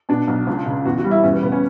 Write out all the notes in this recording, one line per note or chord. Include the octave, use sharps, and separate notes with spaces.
B2 D4
B1
C#2
C#3
E2 F#4
F#4
G3
E4
E2 C#4
B3
C#3 B3
C#4